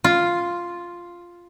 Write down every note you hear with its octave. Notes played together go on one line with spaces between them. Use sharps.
F4